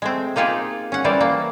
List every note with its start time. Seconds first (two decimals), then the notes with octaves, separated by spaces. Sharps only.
0.02 G#3 A3 C4
0.36 A#3 D#4 F4 G4 G#4
0.92 C#4 F#5
1.04 E3 G3 E4 A#4 C5 D5
1.21 A#3